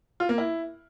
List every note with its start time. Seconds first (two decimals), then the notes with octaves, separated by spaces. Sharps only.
0.20 F4
0.29 A#3
0.38 E4